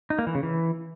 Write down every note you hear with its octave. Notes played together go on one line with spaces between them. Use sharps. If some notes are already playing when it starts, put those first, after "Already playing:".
D#4
A#3
E3
C#3
E3